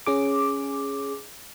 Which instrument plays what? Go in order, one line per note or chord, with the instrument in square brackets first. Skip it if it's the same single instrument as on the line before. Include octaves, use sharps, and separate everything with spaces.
[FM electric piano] C#4 G#4 D6